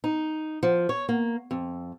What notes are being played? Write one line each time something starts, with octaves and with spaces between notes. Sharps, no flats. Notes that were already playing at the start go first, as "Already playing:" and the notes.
D#4
F3
C#5
A#3
F2